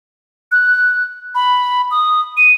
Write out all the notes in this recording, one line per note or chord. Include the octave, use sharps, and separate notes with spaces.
F#6
B5
D#6
D#7